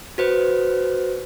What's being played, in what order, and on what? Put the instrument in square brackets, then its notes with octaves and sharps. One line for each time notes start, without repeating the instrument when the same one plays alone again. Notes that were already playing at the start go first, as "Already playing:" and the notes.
[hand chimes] F#4 B4 C5